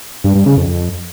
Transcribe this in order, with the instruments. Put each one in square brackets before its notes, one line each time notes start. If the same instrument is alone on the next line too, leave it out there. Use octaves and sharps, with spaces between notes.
[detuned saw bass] G2
G2
C#3
F2
F2